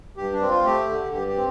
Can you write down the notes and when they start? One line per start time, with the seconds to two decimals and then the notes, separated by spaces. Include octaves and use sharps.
0.17 G2 G4
0.32 D4
0.41 C4
0.49 F4
0.65 A3 G4
0.88 D3
1.12 G2 G4
1.28 G4
1.36 C4